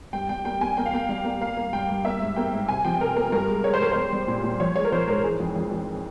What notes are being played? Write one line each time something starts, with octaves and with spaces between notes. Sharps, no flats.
G2 G5
G3 G5
A#3 G5
A#3 G#5
A#3 G5
F5
A#3 G5
G3 F5
A#3
A#3 F5
A#3
G2 G5
G2
A#3 E5
G#2
A#3 G5
G#2
C3 G#5
F3 G5
C3 A#4
A#3 A#4
G2 A#4
G#3
G#3 C#5
C5
G2 A#4
G3 C5
G3
A#2
A#2
F3 C#5
G#3 C#5
A#4
F3 C5
G#2 A#4
E3 G#4
F2
F2
F2